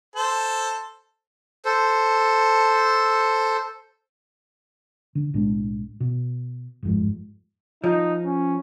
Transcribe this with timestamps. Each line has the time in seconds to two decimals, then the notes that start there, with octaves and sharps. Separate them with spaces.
0.16 A4 C5
1.65 A4 C5
5.15 D3
5.34 B1 A2 G#3 D4
6.00 B2
6.83 G1 F2 G#2
7.84 F3 D#4
8.24 C#4